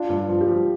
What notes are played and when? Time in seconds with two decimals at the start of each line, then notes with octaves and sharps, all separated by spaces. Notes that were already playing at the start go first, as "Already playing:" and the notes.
Already playing: D4 F4
0.09 G2
0.16 F4
0.29 F3
0.41 G4
0.47 F3